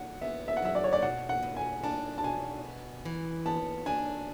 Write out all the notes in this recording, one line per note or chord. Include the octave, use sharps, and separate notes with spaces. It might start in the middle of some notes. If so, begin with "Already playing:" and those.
Already playing: F#5
B3 E5
E5
F#5
F#3 E5
D5
C#5
D5
B2 F#5
F#5
B2
G#5
D4 A5
A5
B2 G#5
B3
E3
B3 A5
D4 G#5